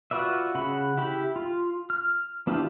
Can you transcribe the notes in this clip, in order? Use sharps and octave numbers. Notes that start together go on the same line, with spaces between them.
F4 F#4 B4 D5 E5
C#3 F#5 B5
E4 G4 B5
F4
F6
B3 D4 E4 F4 G4